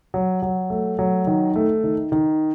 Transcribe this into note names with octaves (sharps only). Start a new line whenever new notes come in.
F#3
F#3
A3
F#3
D#3
A3
D#3
D#3